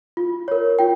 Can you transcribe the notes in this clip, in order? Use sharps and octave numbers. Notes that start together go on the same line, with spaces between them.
F4
A#4 C#5
F4 G5